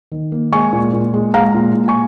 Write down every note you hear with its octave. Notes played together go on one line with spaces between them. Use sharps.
D#3
A#3
G#3 G#5 C#6
A#2
A#2
G#3
G#3 F5 A#5
A#2
A#2
G#5 C#6